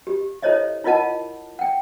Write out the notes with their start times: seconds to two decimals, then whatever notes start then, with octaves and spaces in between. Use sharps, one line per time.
0.07 G4
0.43 E4 A4 C5 C#5 D#5 E5
0.84 E4 F4 A#4 D#5 F#5 A5
1.59 F#5 G5